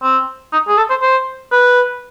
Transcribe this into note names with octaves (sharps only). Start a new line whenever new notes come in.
C4
D#4
G#4
A4
C5
C5
B4